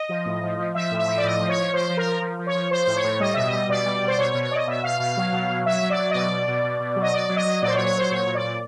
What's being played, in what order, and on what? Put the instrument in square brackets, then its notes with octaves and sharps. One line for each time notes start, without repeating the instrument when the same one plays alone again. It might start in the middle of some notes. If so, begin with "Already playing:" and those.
Already playing: [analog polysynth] D#5
F3
A2
F3
F3
F3 E5
A2
E5
F3
D5
A2 D#5
F3
C#5
F3
F3 C5
F3
A#4
F3
F3
F3
C#5
F3
F3 C5
A2 C5
C#5
A2
G3 D#5
B2 E5
D#5
G3
B2 D5
G3
B2
C5
B2 C#5
C#5
B2
C#5
B2 D5
D#5
B2 E5
B2 F5
B2 F5
F#3
B2
F#3
F#3 E5
F#3
D5
F#3
D#5
B2 D5
B2
B2
B2
B2
F#3
D#5
F#3 D5
F#3
D#5
F#3
A#2 D5
C5
C#5
F#3
C#5
F#3 C5
A#2 C#5
A#2
D5
A#2